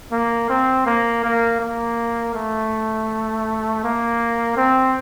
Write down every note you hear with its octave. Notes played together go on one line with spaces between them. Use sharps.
A#3
C4
A#3
A#3
A#3
A3
A#3
C4